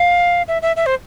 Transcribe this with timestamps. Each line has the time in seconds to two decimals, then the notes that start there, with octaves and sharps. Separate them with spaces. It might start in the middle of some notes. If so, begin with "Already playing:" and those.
Already playing: F5
0.48 E5
0.62 E5
0.76 E5
0.86 C5